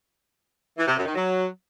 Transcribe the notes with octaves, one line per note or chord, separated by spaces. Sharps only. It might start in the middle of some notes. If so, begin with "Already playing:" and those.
E3
C3
F#2
D#3
F#3